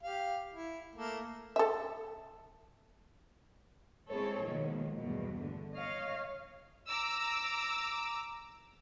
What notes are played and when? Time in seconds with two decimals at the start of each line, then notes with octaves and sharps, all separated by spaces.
0.03 G4 F5
0.53 E4
0.96 A3 A#3
1.56 A4 E5
4.09 G#3 C4 E4 G#4 A4 C#5
4.44 B2 D#3 F3 G#3 A#3
4.99 E2 G2 B2 A3
5.39 D3
5.78 C#5 D#5 F5
6.88 A#5 D6 E6